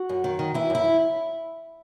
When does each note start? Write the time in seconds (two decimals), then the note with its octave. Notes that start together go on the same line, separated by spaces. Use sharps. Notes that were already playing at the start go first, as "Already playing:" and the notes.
Already playing: F#4
0.09 F#2
0.24 D#3
0.39 D#3
0.54 E3 E4
0.70 F#2 E4